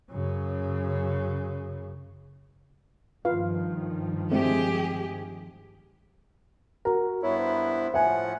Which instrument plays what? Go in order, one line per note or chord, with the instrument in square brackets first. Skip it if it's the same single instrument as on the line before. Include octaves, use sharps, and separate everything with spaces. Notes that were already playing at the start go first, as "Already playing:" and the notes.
[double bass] F#2 C#3
[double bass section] G2 D#3 F3 [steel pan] F4 B4 F5
[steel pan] G#3 A3 C4 [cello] G4 G#4
[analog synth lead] F#4 [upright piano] A#4
[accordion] G2 B3 E4 [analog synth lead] C#5
[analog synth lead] C5
[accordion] A2 F3 F#5 [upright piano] E5 G#5